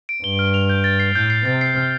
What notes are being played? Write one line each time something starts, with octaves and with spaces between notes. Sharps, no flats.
D7
G2 G7
F6
F7
G6
A6
C7
A2 G6
C7
C3 A6
C7
F6